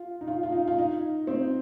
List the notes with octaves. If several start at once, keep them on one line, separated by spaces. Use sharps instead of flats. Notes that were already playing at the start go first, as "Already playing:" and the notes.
Already playing: F4
D#4
F4
F4
D#4
F4
D#4
C4